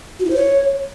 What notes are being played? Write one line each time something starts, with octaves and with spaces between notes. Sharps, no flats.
F#4
E4
C5
C#5